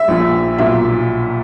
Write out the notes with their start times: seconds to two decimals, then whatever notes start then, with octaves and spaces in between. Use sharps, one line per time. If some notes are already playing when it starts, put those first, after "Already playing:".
Already playing: E5
0.08 A#1 A#2
0.58 B1 A#2 E5